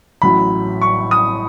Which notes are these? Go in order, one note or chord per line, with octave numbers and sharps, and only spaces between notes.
A1 A2 F#3 B5
C#6
D#6